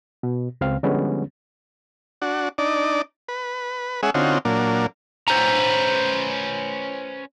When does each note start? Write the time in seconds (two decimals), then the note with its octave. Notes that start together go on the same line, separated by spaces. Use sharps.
0.23 B2
0.61 C#2 C4 F5
0.83 D3 F3 G3 G#3 B3 C#4
2.22 D4 F#4
2.58 D4 D#4 D5
3.29 B4
4.03 G#3 C#4 G#4 E5 F#5
4.14 D3 C4 C#4 D#4 F4 F#4
4.45 A#2 F#3 A#3 D4
5.28 C#4 B4 C5 A#5